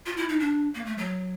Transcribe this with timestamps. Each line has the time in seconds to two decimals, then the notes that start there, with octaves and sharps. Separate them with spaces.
0.06 F4
0.17 E4
0.29 D#4
0.40 D4
0.75 A#3
0.86 A3
0.98 F#3